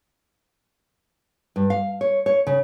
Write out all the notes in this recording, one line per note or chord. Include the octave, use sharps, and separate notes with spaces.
G2
F5
C#5
C#5
C#3